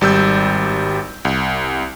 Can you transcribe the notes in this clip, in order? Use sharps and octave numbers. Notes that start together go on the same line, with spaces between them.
G#1 G3 E6 G6
C2